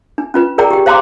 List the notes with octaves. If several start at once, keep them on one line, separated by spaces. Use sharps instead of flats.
D4
C#4 F4 B4
G#4 A#4 D5 G5 A#5
G4 G5
C5 F5 G5 A#5 C6 D6